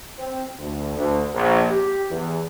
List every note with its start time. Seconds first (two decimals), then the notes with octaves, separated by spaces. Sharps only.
0.18 C4
0.59 D2
0.97 D2
1.34 A#1
1.70 G4
2.10 E2